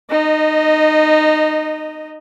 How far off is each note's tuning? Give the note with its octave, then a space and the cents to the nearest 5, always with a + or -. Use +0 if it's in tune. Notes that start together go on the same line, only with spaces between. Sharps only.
D#4 -20 D#5 +0